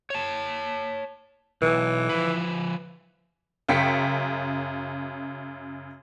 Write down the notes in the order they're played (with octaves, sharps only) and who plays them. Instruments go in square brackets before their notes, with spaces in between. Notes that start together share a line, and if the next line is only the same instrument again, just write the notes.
[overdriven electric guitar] C#5 A5
[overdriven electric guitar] B1 [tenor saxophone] E3
[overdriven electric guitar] F3 B4
[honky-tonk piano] F#2 C#3 G5 B6 C#7